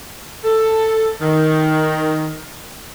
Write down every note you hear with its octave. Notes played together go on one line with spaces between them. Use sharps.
A4
D#3